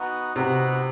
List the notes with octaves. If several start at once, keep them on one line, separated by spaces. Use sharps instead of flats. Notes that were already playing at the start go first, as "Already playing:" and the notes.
Already playing: B3 D#4 F#4
C3 B3 D#4 F#4